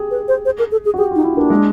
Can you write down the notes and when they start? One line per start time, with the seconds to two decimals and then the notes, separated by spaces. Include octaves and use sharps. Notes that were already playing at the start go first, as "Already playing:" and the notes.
Already playing: G4 G#4
0.11 B4
0.28 C5
0.45 C5
0.59 A#4
0.72 A4
0.85 G#4
0.94 F#4
0.98 G4 G#4
1.11 D#4 F4
1.24 E4
1.33 A#3 D4
1.50 G#3